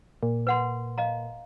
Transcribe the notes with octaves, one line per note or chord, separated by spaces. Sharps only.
A#2
B4 F#5 C6
D#5 F5 A#5